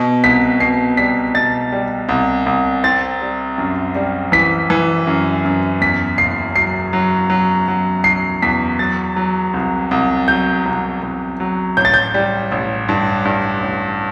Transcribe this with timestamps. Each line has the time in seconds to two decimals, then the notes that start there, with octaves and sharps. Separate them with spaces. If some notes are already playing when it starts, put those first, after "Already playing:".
Already playing: B2
0.24 C2 B6
0.60 B2 C7
0.97 G3 B6
1.34 B2 A6
1.72 G3
2.09 C2
2.46 C2
2.84 C4 A6
3.21 G3
3.58 F#2
3.95 G3
4.32 E3 B6
4.70 E3
5.07 F#2
5.45 F#2
5.81 E2 B6
6.18 F#1 C7
6.56 F#3 C7
6.93 F#3
7.30 F#3
7.68 F#3
8.04 F#3 C7
8.42 E2 B6
8.79 F#3 A6
9.16 F#3
9.54 C2
9.91 C2
10.28 F#3 G6
10.66 C2
11.03 C2
11.40 F#3
11.77 A1 G6
11.85 A6
11.94 G6
12.14 G3
12.52 A1
12.89 G2
13.25 G2
13.62 A1